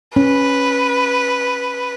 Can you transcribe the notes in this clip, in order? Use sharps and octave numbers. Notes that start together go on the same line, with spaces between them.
C#4 B4